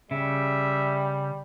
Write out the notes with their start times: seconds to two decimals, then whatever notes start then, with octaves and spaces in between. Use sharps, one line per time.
0.11 C#3 G3 E5